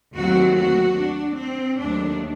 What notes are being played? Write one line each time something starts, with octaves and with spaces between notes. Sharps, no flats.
D#2 D#3 F#3 A3 C4 F#4
F#4
D4
C4
D#2 D#3 F#3 A3 D4